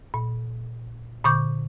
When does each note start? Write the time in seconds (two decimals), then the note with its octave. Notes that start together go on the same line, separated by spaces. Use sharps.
0.14 A#2
1.24 A#2 D3 C#6 D6 G6